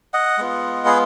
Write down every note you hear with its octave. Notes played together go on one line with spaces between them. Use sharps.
D#5 F#5
G#3 B3 F4
G#4 B4